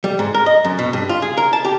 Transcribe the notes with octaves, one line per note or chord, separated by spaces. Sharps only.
G3
G#2
A#4
D#5
F#2
B2
G2
F4
G#4
A#4
A5
G4